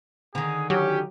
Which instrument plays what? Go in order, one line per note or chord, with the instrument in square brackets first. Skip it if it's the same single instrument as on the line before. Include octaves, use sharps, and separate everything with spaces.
[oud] D3 D#3 [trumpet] G#4
[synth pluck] F#3 [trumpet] C#4 [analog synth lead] G4